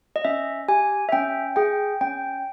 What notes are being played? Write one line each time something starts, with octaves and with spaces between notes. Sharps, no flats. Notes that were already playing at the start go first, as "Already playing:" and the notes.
D#5
C#4 E5
G4 G#5
E5
C#4 G5
G#4 G5
C#4 G5